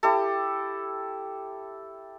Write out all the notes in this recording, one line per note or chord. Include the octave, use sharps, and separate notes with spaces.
E4 G4 A4